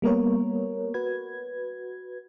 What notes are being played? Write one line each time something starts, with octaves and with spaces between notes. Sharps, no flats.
G3 A#3 B3 A#4 C#5
F#4 B4 G#6